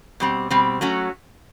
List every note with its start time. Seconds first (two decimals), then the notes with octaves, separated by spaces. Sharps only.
0.20 B2 G3 C4
0.50 B2 G3 C4
0.81 F#3 A3 C#4 F#4